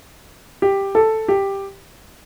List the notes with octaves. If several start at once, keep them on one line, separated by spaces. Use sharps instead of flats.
G4
A4
G4